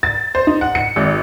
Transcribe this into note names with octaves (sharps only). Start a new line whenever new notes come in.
A6
C5
D#4
F#5
C#7
G#1